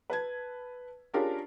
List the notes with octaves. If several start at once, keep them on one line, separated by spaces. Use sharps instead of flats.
B4 A5 G#6
C#4 D4 F4 G4 G#4 A#4